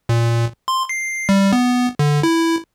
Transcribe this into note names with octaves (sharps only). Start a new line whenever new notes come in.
A#2
C6
C7
G3
B3
D3
E4